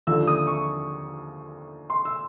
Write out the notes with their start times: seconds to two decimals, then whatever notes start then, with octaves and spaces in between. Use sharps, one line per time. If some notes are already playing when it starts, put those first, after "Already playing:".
0.07 D#2 D3 F3 E6
0.27 D#6
0.47 C#6
1.90 C6
2.05 E6